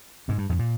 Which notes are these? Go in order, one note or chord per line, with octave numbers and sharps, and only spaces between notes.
G#2 C3
G2
F2 G#2
A#2